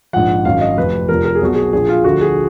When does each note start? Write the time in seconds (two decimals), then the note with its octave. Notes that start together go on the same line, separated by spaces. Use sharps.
0.13 A#1 G#2 F3 F#5
0.45 G#1 F#2 D#3 F5
0.61 D#5
0.77 F1 F2 F3 B4
1.09 F1 F2 F3 A#4
1.25 A#4
1.35 G#4
1.41 B1 B2 F#4
1.54 G#4
1.73 A#1 A#2 F3 G#4
1.89 F4
2.04 D2 D3 F3 F#4
2.21 G#4